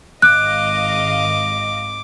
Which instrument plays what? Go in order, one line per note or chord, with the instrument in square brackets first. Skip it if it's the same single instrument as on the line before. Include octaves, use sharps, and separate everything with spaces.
[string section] G#1 D#5 F5 [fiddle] D6 [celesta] F#6